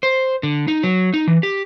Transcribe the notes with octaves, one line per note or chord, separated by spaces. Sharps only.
C5
D3
D#4
F#3
D#4
E3
G4